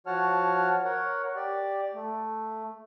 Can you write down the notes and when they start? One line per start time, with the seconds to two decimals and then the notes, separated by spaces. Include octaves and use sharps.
0.07 F3 F#4 C#5 F#5 A5 F6
0.85 A#4 C#5 F#5
1.36 G4 D5
1.94 A3